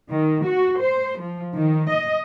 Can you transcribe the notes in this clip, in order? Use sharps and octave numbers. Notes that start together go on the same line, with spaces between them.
D#3
F#4
C5
F3
D#3
D#5